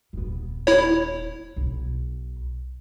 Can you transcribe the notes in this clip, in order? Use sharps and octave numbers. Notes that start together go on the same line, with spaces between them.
D#1 B3
E4 C#5
B1